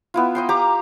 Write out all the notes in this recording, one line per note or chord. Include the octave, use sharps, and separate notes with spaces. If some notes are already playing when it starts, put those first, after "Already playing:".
B3 E4 F4
D#5 G5 C6
G4 A#5 D6